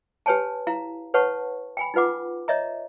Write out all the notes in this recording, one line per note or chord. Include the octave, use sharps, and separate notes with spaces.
G4 B4 C#5 G#5 A5
E4 F5 A#5
B4 C#5 F#5 A5 C#6
G5 G#5 B5
D#4 F4 B4 F#5 D6
C#5 D#5 E5 A#5